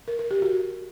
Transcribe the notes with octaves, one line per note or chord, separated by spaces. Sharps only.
A#4
A#4
G4
F#4